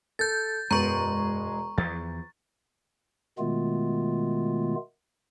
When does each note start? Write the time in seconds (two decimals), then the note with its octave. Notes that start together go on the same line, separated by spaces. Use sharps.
0.19 A4 G6 A6
0.71 E1 F#2 G#3 B3 A#5 C#6
1.78 E2 F3 A6
3.38 B2 D#3 G#3 A3 B3 F4